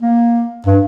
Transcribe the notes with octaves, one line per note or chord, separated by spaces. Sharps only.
A#3
G2